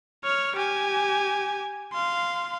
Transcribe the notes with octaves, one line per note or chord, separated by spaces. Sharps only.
C#5 F6
G4 G#5
F5 C6